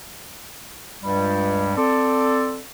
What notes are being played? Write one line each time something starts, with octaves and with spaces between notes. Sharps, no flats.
C#2 G2 G3
C4 A4 D5